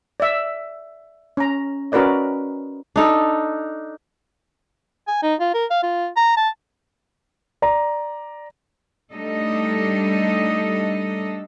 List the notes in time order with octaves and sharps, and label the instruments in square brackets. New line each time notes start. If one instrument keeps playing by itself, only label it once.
[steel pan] D5 E5
C#4 A#5
C#4 F#4 A#4 B4 D5 D#5
[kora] D4 D#4 A4
[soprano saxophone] G#5
D#4
F4
A#4
F5
F4
A#5
A5
[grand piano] D5 A#5
[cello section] G3 A3 D4 D#4 A4 D#5